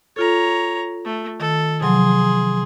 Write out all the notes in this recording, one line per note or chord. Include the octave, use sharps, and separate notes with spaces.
F4 A4 C#5 A#5
A3
D#3 A4
C3 F3 F#3 G#4 C6